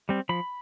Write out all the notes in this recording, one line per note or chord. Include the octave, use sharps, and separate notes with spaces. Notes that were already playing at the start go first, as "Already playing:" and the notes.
G3 C4
F3 B5